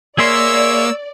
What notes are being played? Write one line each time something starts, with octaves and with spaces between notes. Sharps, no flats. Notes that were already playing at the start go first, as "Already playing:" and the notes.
A#3 G#4 C#5 D5 E5 C6 E6